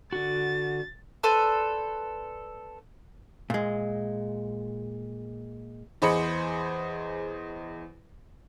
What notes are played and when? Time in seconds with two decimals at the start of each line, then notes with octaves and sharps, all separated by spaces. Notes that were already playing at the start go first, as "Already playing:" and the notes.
0.13 D3 F#4 A6
1.23 A4 B4 C5 D5
3.50 A#2 G#3
6.02 E2 G#4 C5 D#5 B5 C#7